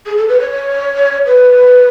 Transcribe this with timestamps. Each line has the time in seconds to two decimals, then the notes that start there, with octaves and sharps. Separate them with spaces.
0.06 G#4
0.17 A4
0.29 B4
0.40 C#5
1.26 B4